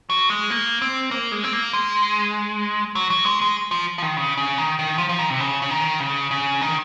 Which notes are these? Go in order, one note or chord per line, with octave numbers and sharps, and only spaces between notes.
F#3
G#3
A#3
C4
A#3
G#3
C4
A#3
G#3
F#3
F#3
G#3
G#3
F3
F3
D#3
C#3
C#3
D#3
D#3
F3
F3
D#3
C3
C#3
C#3
D#3
C#3
C#3
D#3